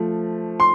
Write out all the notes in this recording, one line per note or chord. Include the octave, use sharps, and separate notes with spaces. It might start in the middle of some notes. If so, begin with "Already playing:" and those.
Already playing: F3 A3
C6